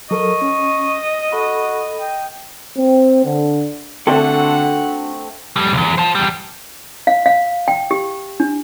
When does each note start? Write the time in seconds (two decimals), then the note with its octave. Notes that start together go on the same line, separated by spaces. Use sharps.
0.11 F#3 A4 A#4 D#5 C#6
0.42 C#4
1.32 F#4 A4 B5
2.00 G5
2.76 C4
3.24 D3
4.07 D3 A3 C4 D4 F#4 A4 F#5
5.56 F2 G3
5.73 B1 E2
5.98 C5 A5
6.15 E2 G3
7.07 F5
7.26 F5
7.68 G5
7.91 G4
8.40 D4